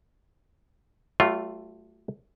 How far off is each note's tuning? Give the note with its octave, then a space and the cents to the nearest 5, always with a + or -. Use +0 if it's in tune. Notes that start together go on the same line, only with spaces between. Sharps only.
F#3 +45 A3 +0 F4 +0